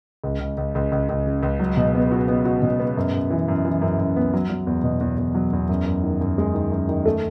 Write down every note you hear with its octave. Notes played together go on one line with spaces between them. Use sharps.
C#2
C#2
C#2
C#2
C#2
C#2
C#3
C#2
F#3
B2
B3
F#4
B3
F#4
B2
B3
F#2
F#2
E3
F#2
E3
F#2
F#2
B3
F#3
F#3
E2
B2
E2
E2
F#3
E2
F#2
F#2
D#3
F#2
G#3
D#3
F#2
D#3
A3